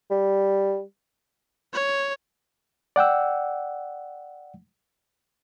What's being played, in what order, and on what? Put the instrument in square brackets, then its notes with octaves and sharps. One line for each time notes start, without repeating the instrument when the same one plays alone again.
[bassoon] G3
[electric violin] C#5
[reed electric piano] D5 F#5 G5 E6